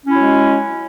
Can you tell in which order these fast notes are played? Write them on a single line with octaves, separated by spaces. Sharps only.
C#4 E4 F#3 G#3